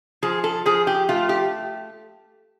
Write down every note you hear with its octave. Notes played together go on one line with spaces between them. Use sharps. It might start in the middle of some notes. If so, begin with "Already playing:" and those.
F3 G#4
A4
F3 G#4
G4
A3 F4
G4